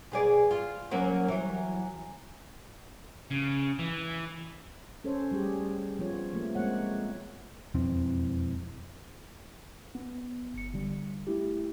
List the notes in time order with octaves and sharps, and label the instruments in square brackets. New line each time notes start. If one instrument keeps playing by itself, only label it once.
[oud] B2 G#4 D5
F4
F#3 A#3 C#4
E3 F#3
[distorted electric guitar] C#3
E3
[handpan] C#4 A4 C5 C#5
G3 A3 G4 G#4
F3 B3 F4 C#5
F3 A3 A#3
G#3 A#3 C4 C#5 F#5
[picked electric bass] E1 F2 E3 C4
[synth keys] B3
G1 C#7
D3 G3
A3 E4 G4